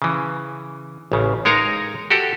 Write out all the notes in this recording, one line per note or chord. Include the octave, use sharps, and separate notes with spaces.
C#3 E3
A1 C#3
G#3 D#4 A#4 C#5 F5 A#5
F#4 G4 A4